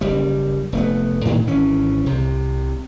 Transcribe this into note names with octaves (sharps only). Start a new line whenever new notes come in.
F#1 G3
F1 A3 B3
A2 D#3 E3
G#1 E3 C#4
C2 C3